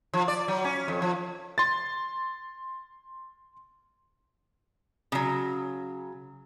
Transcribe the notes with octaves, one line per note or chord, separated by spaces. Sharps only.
F3
D5
F#3
C#4
F2
F3
C6 A6
C#3 F#3